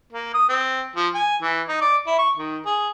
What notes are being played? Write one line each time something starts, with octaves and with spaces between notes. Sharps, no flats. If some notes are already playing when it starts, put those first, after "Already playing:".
A#3
D#6
C4
F3
G#5
E3
D#4
D5
E4
C#6
D#3
G#4